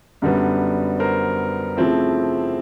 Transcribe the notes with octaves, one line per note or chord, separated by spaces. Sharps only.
F#2 D3 G3 B3
A#4 C5
C#3 F3 A3 C4 E4